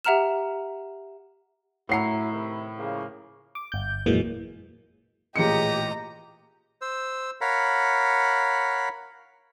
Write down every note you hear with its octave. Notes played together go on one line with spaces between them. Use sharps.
G4 E5 F#5 A#5 F6 E7
F#2 A2 E4 C#5 F#5 A#5 C7
C3 D#3 E4
C#3 F3 A#3
D6
G1 G6
F2 A#2 E3 F#3 G#3 A#3
A1 A#2 G4 G#4 D#5 A#5 C#7
C5 E6
A#4 C#5 F5 F#5 B5